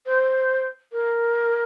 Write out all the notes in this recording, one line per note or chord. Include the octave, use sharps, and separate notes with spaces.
C5
A#4